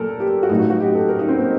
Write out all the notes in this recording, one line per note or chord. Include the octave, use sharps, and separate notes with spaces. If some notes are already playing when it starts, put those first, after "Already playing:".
Already playing: A#2 F#3 A4 A#4
G4
F#4
A2 F#3 D#4
F#4
F#4
G4
A4
A#4
D#4
C4
A#3